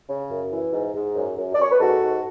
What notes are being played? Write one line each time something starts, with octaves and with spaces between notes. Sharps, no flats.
C#3
F#2
E3
G#2
G#2
F#2
F#2
D5
F#2 C#5
B4
G#2 F#4 A4
G#2